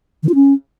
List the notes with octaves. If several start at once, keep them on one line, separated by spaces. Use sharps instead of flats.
D#3
F4
C#4